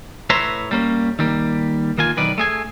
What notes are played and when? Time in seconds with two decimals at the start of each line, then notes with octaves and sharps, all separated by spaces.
0.30 A2 B4 C#5 E5 A#5 C6
0.71 G3 A#3 C#4
1.19 D#3 G3 A#3
1.98 D#3 A#3 F4 G#5
2.17 B1 E2 D#3 B4 D5
2.38 A3 G#4 G#5